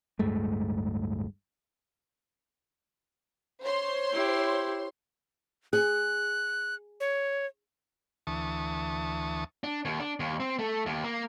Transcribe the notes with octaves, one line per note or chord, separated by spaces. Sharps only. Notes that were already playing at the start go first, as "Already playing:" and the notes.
D1 G2 G#3 A3
C5 C#5 C6
E4 G4
G#4 F#6
C#5
D2 E3 A5 C#6 D#6
D4
D#2
D4
D#2
C4
A3
D#2
A#3